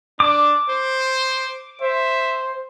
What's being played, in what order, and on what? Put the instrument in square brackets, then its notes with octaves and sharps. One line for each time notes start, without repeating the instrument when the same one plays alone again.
[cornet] D4 [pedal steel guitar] D6
[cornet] C5
[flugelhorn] C5 [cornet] E5